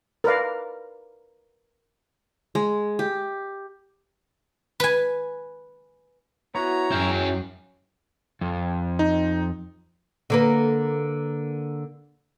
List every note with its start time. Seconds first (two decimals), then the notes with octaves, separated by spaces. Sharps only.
0.24 A#4 B4 D5 F5
2.55 G#3
2.99 G4
4.80 B4 G#5
6.55 B3 E4 F#4 C#5 A#5
6.92 F#2 F#3 E4 G#4 F5 G5
8.41 F2
8.99 D#4
10.30 D3 A#3 B4